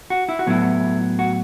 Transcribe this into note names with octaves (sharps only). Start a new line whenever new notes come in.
F#4
E4
F#4
A2 F#3 B3 E4
F#4